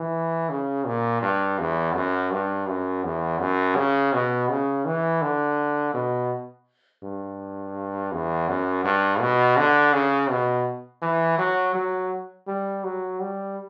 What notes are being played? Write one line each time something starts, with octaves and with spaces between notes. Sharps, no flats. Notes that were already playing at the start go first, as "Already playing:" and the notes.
Already playing: E3
C#3
A#2
G2
E2
F#2
G2
F#2
E2
F#2
C#3
B2
C#3
E3
D3
B2
G2
E2
F#2
G2
B2
D3
C#3
B2
E3
F#3
F#3
G3
F#3
G3